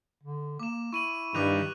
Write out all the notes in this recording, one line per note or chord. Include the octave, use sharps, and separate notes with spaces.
D3
A#3 D6 E7
E4 C#6 D#7 F#7
G2 D#3 G3 D6 F#6 F7